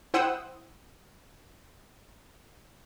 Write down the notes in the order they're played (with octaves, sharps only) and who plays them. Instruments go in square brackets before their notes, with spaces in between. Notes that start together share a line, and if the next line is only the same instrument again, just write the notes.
[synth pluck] E4 C5 F#5 G5 D#6 E6